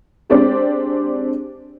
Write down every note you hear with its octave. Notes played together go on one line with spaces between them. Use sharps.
G#3 C4 D4 G4 C5 D5